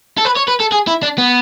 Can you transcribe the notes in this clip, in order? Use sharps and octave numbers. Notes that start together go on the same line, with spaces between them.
A4
B4
C#5
B4
A4
G#4
E4
D4
B3